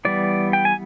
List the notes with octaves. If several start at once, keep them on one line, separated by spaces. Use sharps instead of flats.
E3 G3 B3 D5
G5
G#5